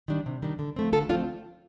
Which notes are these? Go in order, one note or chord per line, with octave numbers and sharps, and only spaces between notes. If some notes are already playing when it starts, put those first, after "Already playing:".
D#3 G3 D4
C3
D#3 G3 D4
D3
F3 A3 C4
D3 F4 A4
F3 A3 C4 D4 F4